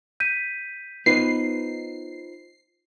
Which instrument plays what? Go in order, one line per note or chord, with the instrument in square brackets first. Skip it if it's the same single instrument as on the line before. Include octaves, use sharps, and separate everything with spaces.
[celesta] G6 B6 D#7
[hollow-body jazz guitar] B3 D#4 B4 [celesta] F4 C5 [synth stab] C7